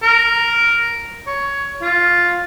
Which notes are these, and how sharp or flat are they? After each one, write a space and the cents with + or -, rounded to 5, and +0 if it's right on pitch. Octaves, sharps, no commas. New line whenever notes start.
A#4 +0
C#5 +15
F4 +5